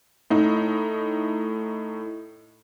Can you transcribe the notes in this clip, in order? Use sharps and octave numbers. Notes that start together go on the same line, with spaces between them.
A2 D#4